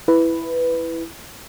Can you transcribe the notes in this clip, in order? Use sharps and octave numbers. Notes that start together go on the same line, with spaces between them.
E4 B4